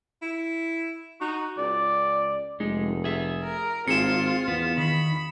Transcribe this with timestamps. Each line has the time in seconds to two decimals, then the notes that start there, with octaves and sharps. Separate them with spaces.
0.22 E4
1.21 D#4 F#4
1.58 C#2 D5
2.60 F1 G#3 D#4
3.04 G#4 E5
3.43 A#4
3.88 G#1 C4 F4 G#4 C#7 E7
4.48 E2 B3
4.78 D#3 B5